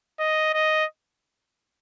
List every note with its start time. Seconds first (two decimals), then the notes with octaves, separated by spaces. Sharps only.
0.20 D#5
0.54 D#5